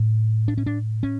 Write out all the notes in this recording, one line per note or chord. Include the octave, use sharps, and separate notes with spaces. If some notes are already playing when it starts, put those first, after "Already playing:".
Already playing: A2
D4
C#4
D4
C#4